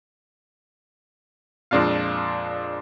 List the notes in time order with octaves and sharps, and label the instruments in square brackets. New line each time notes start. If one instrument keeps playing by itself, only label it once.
[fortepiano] F2 A#2 G#3 D4 F4 F5